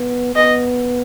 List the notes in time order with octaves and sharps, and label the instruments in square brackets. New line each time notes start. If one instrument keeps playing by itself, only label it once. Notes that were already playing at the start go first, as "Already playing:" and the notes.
Already playing: [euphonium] B3
[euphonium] B3 [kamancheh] D#5